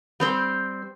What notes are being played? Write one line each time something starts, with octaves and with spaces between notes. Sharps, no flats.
G3 C4 C5